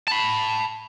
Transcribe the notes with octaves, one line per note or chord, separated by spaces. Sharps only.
A5 B5